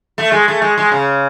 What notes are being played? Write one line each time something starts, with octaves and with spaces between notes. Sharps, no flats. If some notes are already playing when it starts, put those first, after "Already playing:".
A3
G#3
A3
G#3
G#3
C#3